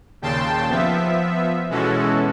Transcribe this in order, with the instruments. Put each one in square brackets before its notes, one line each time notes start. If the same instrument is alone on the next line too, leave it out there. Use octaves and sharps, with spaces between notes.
[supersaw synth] D#2 A#2 C#3 G5 A5 C6
F3 B3 E5
B2 E3 G#3 C#4 F#4 A4